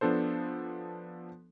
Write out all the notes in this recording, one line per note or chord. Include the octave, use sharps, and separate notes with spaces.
F3 B3 D4 A4 C5